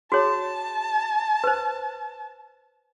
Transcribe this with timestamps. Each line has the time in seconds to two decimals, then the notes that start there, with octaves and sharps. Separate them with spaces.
0.12 F#4 G#4 C#5 A5
1.44 B4 C5